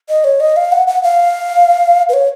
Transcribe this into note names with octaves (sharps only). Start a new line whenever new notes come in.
D#5
C#5
D#5
F5
F#5
F#5
F5
B4
C#5